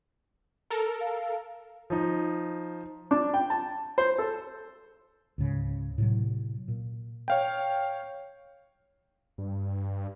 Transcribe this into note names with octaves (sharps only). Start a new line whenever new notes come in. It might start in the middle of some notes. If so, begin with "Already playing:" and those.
A4 A#4
F5
F3 D#4
D4
G5
A5
C5
A4
C#2 G#2 C#3
A2 C3 F#3
A#2
C#5 F5 G5
G2